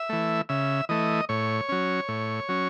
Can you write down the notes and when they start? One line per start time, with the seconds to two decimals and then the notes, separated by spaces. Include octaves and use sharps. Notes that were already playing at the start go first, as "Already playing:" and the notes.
Already playing: E5
0.09 E3 A3
0.49 C#3 E5
0.89 E3 A3 D#5
1.29 A2 C#5
1.69 F#3 C#4
2.08 A2
2.49 F#3 C#4